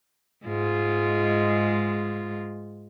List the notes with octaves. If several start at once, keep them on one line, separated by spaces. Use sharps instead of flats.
G#2 G#3 F4